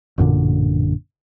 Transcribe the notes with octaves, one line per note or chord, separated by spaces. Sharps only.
A1 F#2 A#2 D3